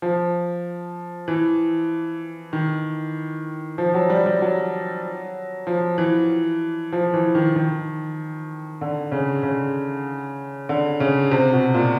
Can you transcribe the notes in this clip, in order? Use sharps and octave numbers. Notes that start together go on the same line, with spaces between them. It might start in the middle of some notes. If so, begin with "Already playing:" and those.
F3
E3
D#3
F3
F#3
G3
G3
F#3
F3
E3
F3
E3
D#3
D#3
D3
C#3
C#3
D3
C#3
C3
B2
A#2